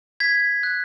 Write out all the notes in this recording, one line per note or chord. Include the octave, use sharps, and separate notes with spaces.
G#6 B6
F#6